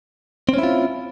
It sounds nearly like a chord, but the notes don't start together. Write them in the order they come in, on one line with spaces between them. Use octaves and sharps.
C4 C#4 E4 F4